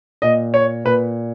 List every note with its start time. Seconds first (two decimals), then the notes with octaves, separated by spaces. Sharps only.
0.22 A#2 D#5
0.54 C#5
0.85 A#2 B4